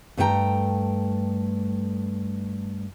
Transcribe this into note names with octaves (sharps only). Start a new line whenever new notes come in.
G2 A3 E4 G#4 G5 A#5